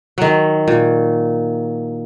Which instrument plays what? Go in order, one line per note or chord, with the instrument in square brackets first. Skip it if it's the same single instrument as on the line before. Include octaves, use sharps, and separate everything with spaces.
[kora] D#3 F#3
A#2